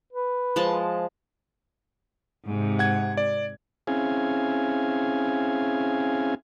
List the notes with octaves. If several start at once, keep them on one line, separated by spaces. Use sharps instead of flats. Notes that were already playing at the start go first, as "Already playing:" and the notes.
B4
F3 G#3 A5
G#2 C3
F#5 G#6
D5
C4 C#4 E4 G#4 F5 G#5